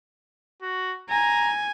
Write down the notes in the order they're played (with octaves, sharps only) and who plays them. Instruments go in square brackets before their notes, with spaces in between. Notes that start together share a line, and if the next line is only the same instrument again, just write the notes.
[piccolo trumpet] F#4
[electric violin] G#5 [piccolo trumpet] A#5